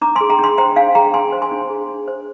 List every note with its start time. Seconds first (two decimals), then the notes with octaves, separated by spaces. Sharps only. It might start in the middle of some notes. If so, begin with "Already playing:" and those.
0.02 D4 A#5 D6
0.16 G#5 C6
0.21 G#4
0.30 G5 A#5
0.39 D4 G#5 C6
0.58 C5 G5 A#5
0.76 D4 F5 G#5
0.95 G#4 G5 A#5
1.14 D4 G#5 C6
1.32 C5
1.42 G#5 C6
1.51 D4
1.70 G#4
1.89 D4
2.08 C5